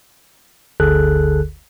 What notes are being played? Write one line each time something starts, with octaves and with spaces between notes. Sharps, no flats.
G1 D2 D3 G#4 A4 F#6